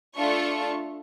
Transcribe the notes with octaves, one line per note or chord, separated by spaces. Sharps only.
A3 D4 F4 A4 C#6